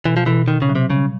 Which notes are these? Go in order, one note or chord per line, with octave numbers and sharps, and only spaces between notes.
B2 E3
F3
B2 E3
B2 D#3
C#3
F#3
C3
C#3 G3